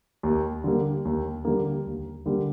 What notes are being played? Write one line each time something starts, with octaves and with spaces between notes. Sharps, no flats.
D#2
D3 G3 A#3
D#2
D3 G3 A#3
D#2
D3 G3 A#3